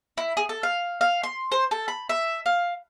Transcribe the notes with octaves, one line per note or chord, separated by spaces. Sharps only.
E4
G#4
A4
F5
F5
C6
C5
A4
B5
E5
F5